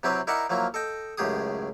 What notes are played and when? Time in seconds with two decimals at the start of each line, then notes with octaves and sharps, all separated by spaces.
0.03 C3 F#3 C4 E4 G4 B4
0.27 D#4 E4 A#4 D5 E5 F#5
0.50 F3 F#3 A#3 E4
0.74 A4 D#5 G5
1.18 C#2 F#2 A2 G4 G#4 D#6